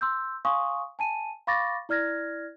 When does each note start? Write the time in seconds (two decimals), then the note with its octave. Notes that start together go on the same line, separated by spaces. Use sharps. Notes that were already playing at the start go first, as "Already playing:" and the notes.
0.01 C6 E6 G6
0.45 F5 G#5 C6 C#6 D#6
0.99 G#5 A5 D#7
1.47 F5 B5 C#6 D6 A6 A#6
1.89 E4 D5 F6 G#6 A#6